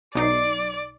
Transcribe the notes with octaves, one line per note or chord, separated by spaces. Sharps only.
B1 D#4 D5 C7